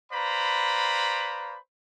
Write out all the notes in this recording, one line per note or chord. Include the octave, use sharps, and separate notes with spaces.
B4 C5 D5 F5 A#5 B5